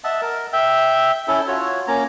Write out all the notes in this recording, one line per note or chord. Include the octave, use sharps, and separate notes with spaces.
D#5 E5 F#5 A5
A#4
E5 G5
C#4 E4 A4
F4 F#4 C#5
A#3 C#4 A#5